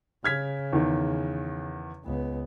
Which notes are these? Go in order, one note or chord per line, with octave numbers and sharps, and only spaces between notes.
C#3 F6 G#6 B6
E2 D#3
C#2 B3